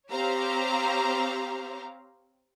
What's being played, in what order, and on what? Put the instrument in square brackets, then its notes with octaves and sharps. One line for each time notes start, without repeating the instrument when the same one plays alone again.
[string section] C4 G4 C5 C#5 F5 A#5